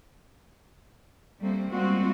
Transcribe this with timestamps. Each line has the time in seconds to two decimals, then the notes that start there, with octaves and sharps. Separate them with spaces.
1.39 G3 A3 A#3 C4
1.69 G3 G#3 A#3 C4 F4 F#4